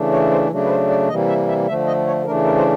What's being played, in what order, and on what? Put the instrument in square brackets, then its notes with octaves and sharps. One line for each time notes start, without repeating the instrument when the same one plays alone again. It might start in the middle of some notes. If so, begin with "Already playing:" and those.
Already playing: [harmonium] C#3 E3 A3 D4
C#5
C5
C#3 F#3 A3 D4
B4
C5
D5
C3 E3 G3 A#3 D#5
E5
E5
D3 F3 A3 E5
D#5
C#5
C#3 E3 A3 D4 A#4
A#4
C5